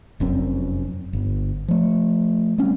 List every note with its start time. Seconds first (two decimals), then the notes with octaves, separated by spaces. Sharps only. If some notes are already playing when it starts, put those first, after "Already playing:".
0.20 F1 F#2 C4
1.13 G1
1.68 F3 A3
2.58 G3 A3 C4 C#4